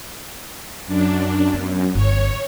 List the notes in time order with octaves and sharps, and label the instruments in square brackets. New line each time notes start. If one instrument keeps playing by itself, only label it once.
[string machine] F#2 D4
[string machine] F#2 [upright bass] B3
[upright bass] G1 [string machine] C#5